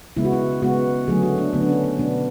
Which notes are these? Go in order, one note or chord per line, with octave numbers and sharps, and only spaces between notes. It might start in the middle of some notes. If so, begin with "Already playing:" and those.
C#3 G#3 B3 E4
F#4
E4
C#3 G#3 B3 F#4
D3 F#3 A3 G#4
F#4
D4
D3 F#3 A3 B3
D4
C#4
C#4
B2 F#3 B3 D4